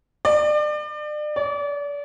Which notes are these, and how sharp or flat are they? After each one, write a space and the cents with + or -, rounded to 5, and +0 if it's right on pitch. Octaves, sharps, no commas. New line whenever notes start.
D5 +35
D5 -35